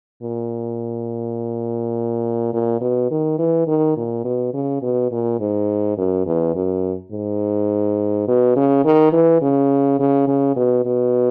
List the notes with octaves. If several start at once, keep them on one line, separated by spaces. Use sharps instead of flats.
A#2
A#2
B2
D#3
E3
D#3
A#2
B2
C#3
B2
A#2
G#2
F#2
E2
F#2
G#2
B2
C#3
D#3
E3
C#3
C#3
C#3
B2
B2